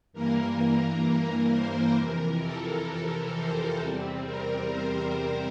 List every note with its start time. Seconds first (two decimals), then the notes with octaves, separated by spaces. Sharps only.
0.13 G2 E3 A#3 A#4
1.50 C5
1.96 F2 C3 E3 A#4
2.41 A4
2.88 A#4
3.33 C5
3.79 E2 C3 G3 C4
4.25 A#4
4.71 C5
5.17 A#4